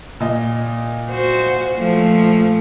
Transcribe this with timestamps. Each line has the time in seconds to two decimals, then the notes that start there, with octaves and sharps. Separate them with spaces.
0.20 A#2 D#5
1.11 F#4 C5
1.78 F3 A3